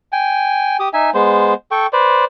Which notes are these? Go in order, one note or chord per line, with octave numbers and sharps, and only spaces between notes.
G5 G#5
G4 D#6
D#4 E5 G#5
G#3 B3 C5
A4 G5 C#6
B4 C5 D5